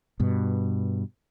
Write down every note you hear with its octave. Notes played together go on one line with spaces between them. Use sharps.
G2 B2